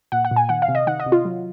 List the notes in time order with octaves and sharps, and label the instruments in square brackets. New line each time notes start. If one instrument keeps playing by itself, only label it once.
[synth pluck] A#2 F#5
F#5
A#2
G#5
D#3 F#5
F5
C3
D#5
D#3 F#5
D#5
C3
F4
F#3